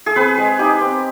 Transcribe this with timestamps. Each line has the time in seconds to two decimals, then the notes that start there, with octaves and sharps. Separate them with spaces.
0.06 G#4
0.16 C4 B4
0.38 G#3
0.59 D#4 G4
0.81 C4